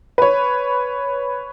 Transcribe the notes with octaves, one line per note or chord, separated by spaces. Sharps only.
B4 C#5